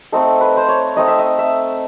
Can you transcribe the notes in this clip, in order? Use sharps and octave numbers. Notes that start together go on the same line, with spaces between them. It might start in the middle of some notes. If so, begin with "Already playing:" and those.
A3 C4 D#4 A4
B4
C5
C#5
A3 C4 D#4 D#5
E5
D#5
E5